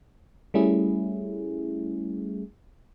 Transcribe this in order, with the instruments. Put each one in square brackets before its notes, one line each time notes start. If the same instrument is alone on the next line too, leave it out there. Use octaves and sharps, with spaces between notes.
[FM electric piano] G3 A3 C#4 E4 G#4